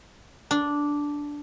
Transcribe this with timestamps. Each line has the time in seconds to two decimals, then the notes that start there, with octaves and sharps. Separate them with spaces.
0.51 D4